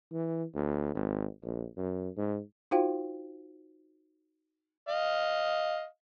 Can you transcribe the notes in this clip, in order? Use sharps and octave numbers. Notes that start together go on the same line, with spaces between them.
E3
D2
G#1
A#1
F#2
G#2
D#4 F4 F#4 C5 F5 G5
D#5 F5